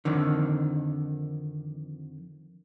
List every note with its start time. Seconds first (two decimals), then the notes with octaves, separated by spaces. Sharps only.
0.05 F2 D3 D#3